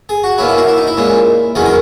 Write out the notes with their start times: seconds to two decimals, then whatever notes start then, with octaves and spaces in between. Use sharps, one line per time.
0.09 G#4
0.23 F#4
0.38 B2 A#3 C#4 E4
0.48 E4
0.57 F#4
0.68 E4
0.77 D#4
0.87 E4
0.97 A#2 G#3 C#4
1.55 E2 D#3 F#3 C#4 G#4
1.66 A#4